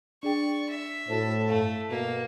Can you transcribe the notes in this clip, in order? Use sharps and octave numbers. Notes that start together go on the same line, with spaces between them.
D4 G#4 D5 G5 C#6
E5
A2 F#4 A4 C5
G2 A3 F5
B2 A#3 F#4